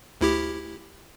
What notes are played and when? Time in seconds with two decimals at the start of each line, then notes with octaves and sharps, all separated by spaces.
0.21 D2 E4 G4